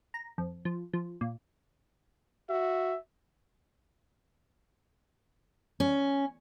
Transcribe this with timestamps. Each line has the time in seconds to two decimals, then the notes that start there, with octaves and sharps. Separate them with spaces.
0.14 A#5
0.38 F2
0.65 F3
0.94 F3
1.21 A#2
2.50 F#4 E5
5.80 C#4